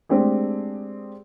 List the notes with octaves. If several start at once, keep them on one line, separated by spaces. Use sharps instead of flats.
G#3 A3 C4 D4 G4 G#4